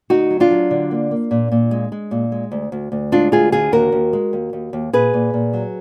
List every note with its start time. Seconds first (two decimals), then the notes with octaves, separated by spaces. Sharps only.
0.10 D2 D#4 F#4
0.30 F#3
0.40 D4 F4
0.51 F#3
0.71 D3
0.91 A#3
1.11 A#3
1.31 A#2
1.52 A#2
1.71 G#3
1.92 G#3
2.11 A#2
2.32 G#3
2.52 D2
2.72 D2
2.92 D2
3.12 G#3 D4 F4
3.32 D2 F4 G#4
3.52 D3 F4 G#4
3.72 D#2 F#4 A#4
3.92 D#2
4.13 G#3
4.33 D#2
4.53 D#2
4.73 D#2
4.93 A#2 G#4 B4
5.14 A#2
5.33 A#2
5.53 F#3